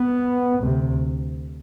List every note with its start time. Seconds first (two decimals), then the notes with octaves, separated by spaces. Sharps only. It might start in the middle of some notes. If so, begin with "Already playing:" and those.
Already playing: B3
0.62 D2 C3